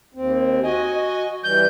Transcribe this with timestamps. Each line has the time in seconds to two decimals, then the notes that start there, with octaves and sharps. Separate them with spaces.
0.14 D#2 C4
0.64 F#4 D#5 G#5
0.95 D#5
1.44 E3 G3 G6